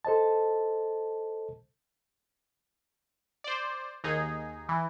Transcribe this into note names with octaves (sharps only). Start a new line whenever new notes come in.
A4 C5 D#5 A5
C5 D5
D#2 D#4 G#4
E3